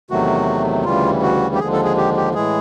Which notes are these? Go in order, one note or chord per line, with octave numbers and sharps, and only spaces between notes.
E2 C3 D#3 F#3 A3 F#4
D2 C#3 E3 G3 F4
F#4
G4
D#2 D3 F3 G#3 G#4
A4
G#4
G4
G4
A2 E3 G#3 G#4